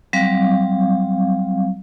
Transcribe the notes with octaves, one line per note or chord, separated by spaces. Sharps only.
F#3 G3 C4 F5